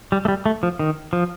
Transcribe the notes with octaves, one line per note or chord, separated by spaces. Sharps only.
G3
A3
G3
A3
F3
D#3
F3